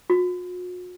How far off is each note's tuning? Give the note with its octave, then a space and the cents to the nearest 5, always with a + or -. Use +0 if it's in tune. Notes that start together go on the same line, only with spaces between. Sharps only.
F#4 -45